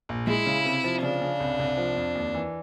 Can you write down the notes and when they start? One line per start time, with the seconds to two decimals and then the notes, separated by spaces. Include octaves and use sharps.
0.09 A#1
0.27 G#3 E4
0.46 C#3
0.65 C3
0.84 F3
1.02 C#3 D4
1.21 C#3
1.40 C2
1.59 C2
1.78 F3
1.97 F2
2.15 D#2
2.34 E3